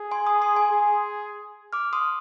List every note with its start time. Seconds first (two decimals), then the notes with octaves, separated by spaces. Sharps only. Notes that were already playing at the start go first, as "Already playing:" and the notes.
Already playing: G#4
0.11 G#5 C6
0.27 C6 D#6
0.42 C6 D#6
0.56 G#5 C6
0.71 G#4
1.73 D6 F6
1.93 C6 D#6